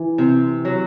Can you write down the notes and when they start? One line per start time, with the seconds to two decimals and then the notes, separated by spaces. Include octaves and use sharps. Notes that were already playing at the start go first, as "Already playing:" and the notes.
Already playing: E3
0.18 C3
0.65 F#3